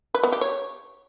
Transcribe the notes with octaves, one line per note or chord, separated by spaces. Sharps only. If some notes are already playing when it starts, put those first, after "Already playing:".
B4
B3
G4
C#5